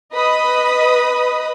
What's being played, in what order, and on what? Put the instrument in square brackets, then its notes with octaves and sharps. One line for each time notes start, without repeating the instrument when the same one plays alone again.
[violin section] B4 D#5 B5 D#6